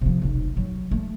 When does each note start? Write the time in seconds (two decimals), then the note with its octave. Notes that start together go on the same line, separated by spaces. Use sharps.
0.01 C3 F3
0.22 F1 B1
0.57 F#3
0.91 A3